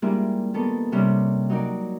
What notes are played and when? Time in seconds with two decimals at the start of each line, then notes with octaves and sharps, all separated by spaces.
0.02 G3 G#3 A#3 D4 E4 F4
0.54 D#3 A#3 B3 A4
0.92 C3 G3 C#4 D4 G4
1.49 F#3 D#4 A#4 D5